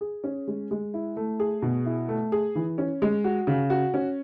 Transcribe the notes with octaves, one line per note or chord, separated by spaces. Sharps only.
G#4
C#4
G#3
G#3
E4
A3
G#4
B2
E4
A3
G#4
E3
C#4
G#3
F#4
C#3
F#4
C#4